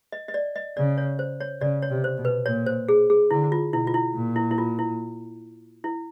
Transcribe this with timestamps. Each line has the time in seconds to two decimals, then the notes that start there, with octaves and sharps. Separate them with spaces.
0.12 D#5
0.28 D#5
0.34 D5
0.56 D#5
0.77 C#3 D5
0.98 C#5
1.19 C5
1.40 C#5
1.61 C#3 D5
1.82 C#5
1.90 C3
2.04 C5
2.18 B2
2.25 B4
2.45 A#2 C#5
2.66 C5
2.88 G#4
3.10 G#4
3.31 D3 E4
3.52 F4
3.73 B2 E4
3.87 F4
3.94 E4
4.15 A#2
4.36 E4
4.51 E4
4.58 F4
4.79 E4
5.84 E4